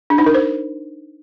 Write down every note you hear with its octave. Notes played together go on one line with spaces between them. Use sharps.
D4
D#4
A#4
C5